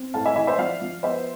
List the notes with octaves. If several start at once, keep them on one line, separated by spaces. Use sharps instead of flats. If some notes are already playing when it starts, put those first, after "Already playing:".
Already playing: C4
A2 F5 A5
E5 G#5
E3 E5 G#5
C5 E5
F3 D5 F5
F3
B3 C5 E5